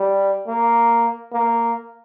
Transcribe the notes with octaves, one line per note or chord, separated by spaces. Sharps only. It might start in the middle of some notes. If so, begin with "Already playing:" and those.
Already playing: G3
A#3
A#3